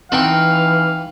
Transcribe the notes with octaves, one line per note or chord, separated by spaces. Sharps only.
E3 C4 D#4 B4 F5 G5 C6 C#6